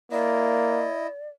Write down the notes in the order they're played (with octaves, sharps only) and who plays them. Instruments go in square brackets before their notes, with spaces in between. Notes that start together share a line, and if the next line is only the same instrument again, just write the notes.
[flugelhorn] A#3 [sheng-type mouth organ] E4 D#5 [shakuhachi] D5